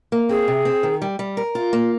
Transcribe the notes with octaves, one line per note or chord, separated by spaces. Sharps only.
A#3
C4 G#4
C3
C4
D#3
G3
G3
A#4
F4
A#3